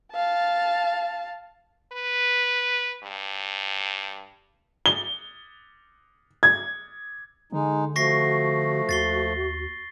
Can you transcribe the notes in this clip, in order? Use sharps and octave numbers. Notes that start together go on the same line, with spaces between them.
F5 A5
B4
G2
G7
G#6
D3 G#3 D#4
F3 A3 F#4 C#6 A#6 C7
D#2 A6 C7 G7